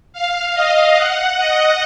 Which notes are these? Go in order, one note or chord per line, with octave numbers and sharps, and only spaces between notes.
F5
D#5
F#5
D#5